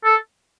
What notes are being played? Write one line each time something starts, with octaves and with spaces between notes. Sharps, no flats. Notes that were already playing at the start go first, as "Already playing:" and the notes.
A4